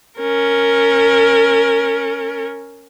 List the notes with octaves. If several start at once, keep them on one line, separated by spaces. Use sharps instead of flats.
C#4 A#4